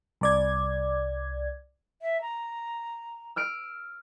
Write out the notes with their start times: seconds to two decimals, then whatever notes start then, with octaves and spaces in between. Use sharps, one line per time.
0.21 C2 D5 G#6
2.02 E5
2.22 A#5
3.36 E6 F6 D7